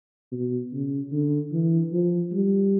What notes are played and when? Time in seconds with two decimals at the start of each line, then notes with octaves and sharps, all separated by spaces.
0.32 B2
0.72 C#3
1.12 D3
1.52 E3
1.93 F3
2.33 G3